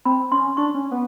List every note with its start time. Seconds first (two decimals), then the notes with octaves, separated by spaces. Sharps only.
0.05 C4 B5
0.31 C#4 C6
0.57 D4 C#6
0.74 C#4
0.91 B3